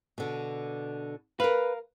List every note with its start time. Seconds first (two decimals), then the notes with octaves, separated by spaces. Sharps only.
0.18 B2 D3
1.40 A#4 B4 F5